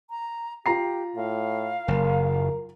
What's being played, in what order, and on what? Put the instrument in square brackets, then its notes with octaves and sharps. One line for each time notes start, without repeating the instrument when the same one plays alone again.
[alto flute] A#5
[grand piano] F4 A#5 C7 [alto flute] G4
[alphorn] A2 [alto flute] F5
[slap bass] F#1 [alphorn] A#4